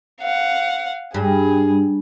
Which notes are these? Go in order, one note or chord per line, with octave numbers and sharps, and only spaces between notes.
F5 F#5
G2 G#4